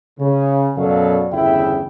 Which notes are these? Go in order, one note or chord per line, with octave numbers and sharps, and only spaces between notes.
C#3
F#2 B2 F#3 A4 D5 F5
G1 E2 C#3 E4 E5 G5